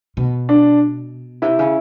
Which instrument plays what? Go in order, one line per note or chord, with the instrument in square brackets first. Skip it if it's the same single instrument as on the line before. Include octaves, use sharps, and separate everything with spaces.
[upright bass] B2
[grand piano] D4
[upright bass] C3 [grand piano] E4
[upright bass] C#3